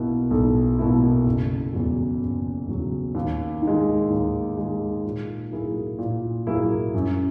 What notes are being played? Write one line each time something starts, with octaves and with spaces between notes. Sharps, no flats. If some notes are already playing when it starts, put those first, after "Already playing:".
Already playing: B1 B2 A#3 E4
B1
B2 A#3 E4
F#1
E2 C#3 F#3
F#1
E2 C#3 F#3
D#2
D#3
G#3
D#2
D#3 G#3
A#2
F#3 A#3 E4 G#4
A#2
F#3 A#3 E4 G#4
F#2